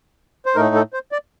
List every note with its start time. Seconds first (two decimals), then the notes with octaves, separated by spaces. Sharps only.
0.46 C5
0.55 A2 A3 D#4 A#4
0.75 A4
0.93 C5
1.12 D5